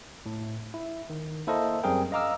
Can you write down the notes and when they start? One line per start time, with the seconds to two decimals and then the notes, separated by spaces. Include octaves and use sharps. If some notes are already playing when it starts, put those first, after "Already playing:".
0.26 A2
0.74 E4
1.10 D#3
1.47 A#3 E4 A4 A#4 C5 D#5
1.83 F#2 G3 C4 G#4 A#4 G5
2.12 D#5 F5 A#5 D6 E6 F6